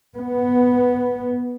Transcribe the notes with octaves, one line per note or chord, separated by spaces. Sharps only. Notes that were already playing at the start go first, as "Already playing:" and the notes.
B3